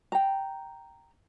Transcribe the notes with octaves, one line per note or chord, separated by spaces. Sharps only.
G5 A#5